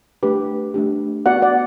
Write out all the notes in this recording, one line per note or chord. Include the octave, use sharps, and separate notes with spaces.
A3 D4 G4 B4
A3 D4 G4
B3 F#4 D5 F#5
D5 F#5